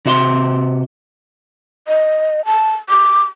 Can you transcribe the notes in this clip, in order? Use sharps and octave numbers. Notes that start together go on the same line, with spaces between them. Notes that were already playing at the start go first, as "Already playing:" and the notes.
C3 F#4 E5 B5 C6
D#5
A5
D6